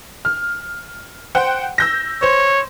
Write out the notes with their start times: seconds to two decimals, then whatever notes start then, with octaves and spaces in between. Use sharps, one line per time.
0.25 F6
1.35 C5 F#5 G5
1.78 E6 G6 A#6
2.23 C5 C#5